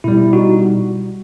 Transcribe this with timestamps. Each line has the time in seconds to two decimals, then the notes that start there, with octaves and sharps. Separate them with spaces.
0.04 B2 G3 E4
0.33 D#4 F#4